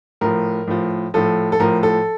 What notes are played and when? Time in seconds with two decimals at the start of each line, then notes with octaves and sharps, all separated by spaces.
0.21 A2 F3 A#4
0.67 A2 F3
1.14 A2 F3 A4
1.52 A4
1.60 A2 F3 A#4
1.83 A4